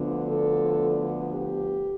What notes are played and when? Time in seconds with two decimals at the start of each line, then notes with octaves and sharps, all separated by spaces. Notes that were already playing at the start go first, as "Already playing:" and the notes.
Already playing: D2 D3 F3 B3
0.28 A4
1.31 G4